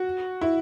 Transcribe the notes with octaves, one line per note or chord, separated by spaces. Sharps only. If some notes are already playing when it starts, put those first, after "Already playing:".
Already playing: F#4
E4